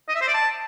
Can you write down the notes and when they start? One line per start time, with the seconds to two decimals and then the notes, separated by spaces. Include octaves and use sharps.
0.09 D#5
0.15 E5
0.21 C5
0.28 D5
0.34 A5